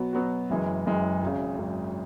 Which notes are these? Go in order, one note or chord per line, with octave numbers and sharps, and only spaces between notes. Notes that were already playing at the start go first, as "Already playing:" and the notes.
Already playing: B2 F#3 B3 F#4
B2 F#3 B3 F#4
F#1 F#2 E3 G#3
F#1 F#2 E3 G#3
G#1 F#2 C#3
G#1 F#2 C#3